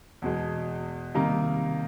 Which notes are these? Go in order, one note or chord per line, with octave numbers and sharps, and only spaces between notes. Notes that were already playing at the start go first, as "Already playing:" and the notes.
E2 B2 G#3
C3 D#3 G3 A#3 D#4